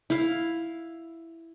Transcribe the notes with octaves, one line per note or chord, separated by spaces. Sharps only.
E4 F5